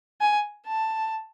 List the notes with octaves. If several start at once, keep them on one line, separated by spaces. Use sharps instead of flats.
G#5
A5